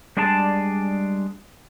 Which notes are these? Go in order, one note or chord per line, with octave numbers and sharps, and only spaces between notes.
G3 G#3 D4 G#4 D5 A5